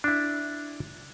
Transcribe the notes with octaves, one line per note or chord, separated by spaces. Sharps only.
D4 E4